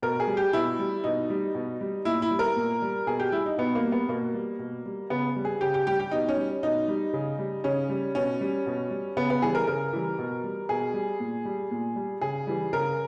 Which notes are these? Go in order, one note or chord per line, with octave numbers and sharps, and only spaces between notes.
B2 A#4
G#4
G3
G4
B2 E4
G3
B2 D#4
G3
B2
G3
A#2 E4
E4
G3
A#4
A#2
G3
B2 G#4
G4
G3 E4
D#4
B2 B3
A#3
G3
B3
B2 A#3
G3
B2
G3
C#3 B3
G3
G#4
C#3 G4
G4
G3 G4
G4
B2 D#4
C#4
G3
B2 D#4
G3
C#3
G3
C#3 C#4
G3
B2 C#4
G3
B2
G3
C#3 B3
B3
E3 G3 G#4
A#4
C#3 A#4
E3 G3
B2
G3
B2 G#4
G3
A#2
G3
A#2
G3
C#3 G#4
E3 G3
C#3 A#4